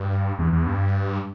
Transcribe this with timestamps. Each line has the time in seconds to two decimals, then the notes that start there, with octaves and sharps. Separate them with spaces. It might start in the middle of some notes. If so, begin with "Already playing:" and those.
Already playing: G2
0.39 E2
0.53 E2
0.67 G2